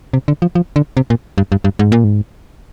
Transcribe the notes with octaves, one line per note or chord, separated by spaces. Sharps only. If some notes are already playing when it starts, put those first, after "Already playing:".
C3
D3
F3
F3
D3
C3
A#2
G2
G2
G2
G#2
A#2
G#2